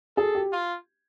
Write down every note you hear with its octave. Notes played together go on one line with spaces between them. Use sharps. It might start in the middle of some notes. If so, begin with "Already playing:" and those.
G#4 A4
G4
F4